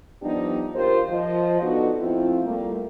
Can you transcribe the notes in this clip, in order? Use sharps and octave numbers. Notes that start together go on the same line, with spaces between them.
F3 G3 B3 D4 D#4 G4
D#2 F4 G4 A#4 C5
F3 D#5
B3 D4 D#4 F#4 A4
F3 A3 C4 E4 F4
G3 A3 A#3